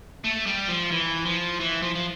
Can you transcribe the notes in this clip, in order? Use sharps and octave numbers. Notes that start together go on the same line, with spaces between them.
A3
G3
F3
E3
F3
E3
F3
F3